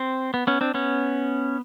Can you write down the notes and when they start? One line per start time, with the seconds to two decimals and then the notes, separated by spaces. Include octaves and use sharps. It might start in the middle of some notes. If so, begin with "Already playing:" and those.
Already playing: C4
0.34 B3
0.47 B3 C#4
0.61 C4 D4
0.74 B3 C#4